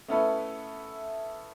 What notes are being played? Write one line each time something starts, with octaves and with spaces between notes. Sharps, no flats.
A3 B3 C#4 E4 A4 B4